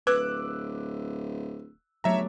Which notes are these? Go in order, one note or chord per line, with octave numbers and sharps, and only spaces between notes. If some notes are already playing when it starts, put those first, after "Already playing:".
D1 B4 D6 E6 F#6
G1 F#3 A3 D4 C#5 E5 A#5